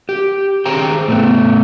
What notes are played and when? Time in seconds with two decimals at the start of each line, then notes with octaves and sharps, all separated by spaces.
0.09 G4
0.66 G#4 C5 G5 A#5
1.08 A2 A3 B3